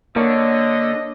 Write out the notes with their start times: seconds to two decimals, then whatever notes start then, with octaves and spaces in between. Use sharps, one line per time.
0.16 D3 A#3 D4 C#5 D#5